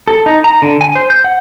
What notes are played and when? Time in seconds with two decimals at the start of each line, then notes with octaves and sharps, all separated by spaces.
0.08 A4
0.26 D#4
0.44 A#5
0.62 D3
0.81 G#5
0.95 C5
1.10 G6
1.24 F#5